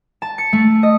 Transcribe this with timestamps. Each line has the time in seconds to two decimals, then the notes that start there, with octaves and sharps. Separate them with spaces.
0.22 A5
0.38 C#7
0.53 A3
0.83 D#5